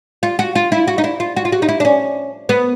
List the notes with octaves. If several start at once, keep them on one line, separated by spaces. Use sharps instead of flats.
F4
F#4
F4
E4
F#4
D#4
E4
F4
F#4
F4
F#4
D#4
E4
D4
C#4
B3